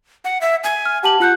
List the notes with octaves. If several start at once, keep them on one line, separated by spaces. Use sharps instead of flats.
F#5
E5
G#5
F6
G4 F#5 A5 F#7
F4 F#5 F#6 G6